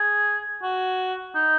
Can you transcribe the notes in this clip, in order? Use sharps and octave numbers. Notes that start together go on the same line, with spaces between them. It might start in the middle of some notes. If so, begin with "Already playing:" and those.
Already playing: G#4
F#4
D#4